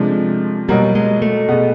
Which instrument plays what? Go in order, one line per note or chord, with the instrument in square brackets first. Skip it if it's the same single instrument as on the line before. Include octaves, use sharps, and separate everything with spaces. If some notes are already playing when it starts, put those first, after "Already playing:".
Already playing: [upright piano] C3 F3 A3 D4 [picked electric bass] G#3
[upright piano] B2 F#3 A#3 [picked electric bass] G3
[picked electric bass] G#3
A3
[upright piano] B2 G#3 B3